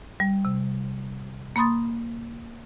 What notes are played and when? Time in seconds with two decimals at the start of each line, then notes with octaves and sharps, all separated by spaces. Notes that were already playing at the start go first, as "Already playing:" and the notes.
0.20 G3
0.45 C3
1.56 A#3 B5 C6 D#6 A6